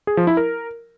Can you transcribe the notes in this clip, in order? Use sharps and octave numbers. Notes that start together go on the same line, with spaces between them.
G#4
F3
E4
A#4